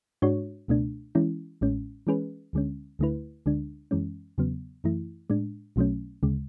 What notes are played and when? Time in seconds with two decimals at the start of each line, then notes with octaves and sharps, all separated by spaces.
0.22 G#2 G#3 D4 F#4 C#5
0.68 C#2 B2 A3 D4
1.15 E3 G#3 C#4 E4
1.61 A1 A2 G#3 C#4
2.07 E3 G#3 C#4 G#4 B4
2.53 D2 D3 G#3 C#4
2.99 D2 D3 A3 E4 B4
3.46 D2 D3 G#3 D4
3.91 F#2 E3 G#3 C#4
4.38 E2 C#3 F#3 B3
4.84 F#2 E3 A3 E4
5.30 A2 G#3 D4
5.76 B1 B2 F#3 A3 C#4
6.23 D2 C#3 G#3